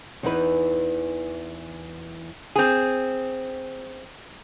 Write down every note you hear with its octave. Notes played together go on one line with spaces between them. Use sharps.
E2 E3 D#4 E4 B4
C4 G#4